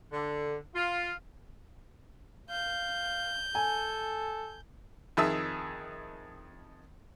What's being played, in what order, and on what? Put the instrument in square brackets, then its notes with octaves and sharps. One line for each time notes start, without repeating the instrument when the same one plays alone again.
[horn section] D3
F4
[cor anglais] F5 [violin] G6
[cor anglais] A4 [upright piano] G#5
[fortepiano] F2 D#3 G#4 E5 A5 E6